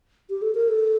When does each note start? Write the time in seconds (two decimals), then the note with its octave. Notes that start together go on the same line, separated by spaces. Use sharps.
0.30 G4
0.42 A4
0.55 A#4
0.68 A4